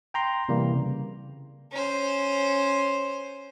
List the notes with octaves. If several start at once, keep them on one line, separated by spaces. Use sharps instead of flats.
G5 A#5 C6
C3 E3 G3 A#3
C#3
C#4 C5